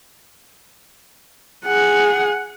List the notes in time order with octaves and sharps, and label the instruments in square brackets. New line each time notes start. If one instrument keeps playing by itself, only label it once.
[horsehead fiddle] G#4 F#5